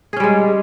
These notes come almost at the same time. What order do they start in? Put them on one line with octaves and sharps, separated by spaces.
G#4 C#4 G3 G#3